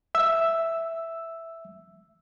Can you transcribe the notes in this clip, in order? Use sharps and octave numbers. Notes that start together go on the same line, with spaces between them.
E5 E6